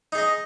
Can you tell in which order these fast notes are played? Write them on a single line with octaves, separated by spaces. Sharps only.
D#4 G#4 D#5